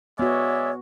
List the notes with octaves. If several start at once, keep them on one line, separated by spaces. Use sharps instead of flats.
G#3 B3 F#4 C#5 D5 E5